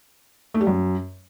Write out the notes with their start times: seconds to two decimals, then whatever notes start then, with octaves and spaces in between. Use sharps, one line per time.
0.54 A3
0.61 G3
0.67 F#2